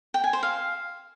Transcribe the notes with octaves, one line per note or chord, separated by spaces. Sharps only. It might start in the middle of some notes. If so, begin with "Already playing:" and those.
G5
G#5
C5
F5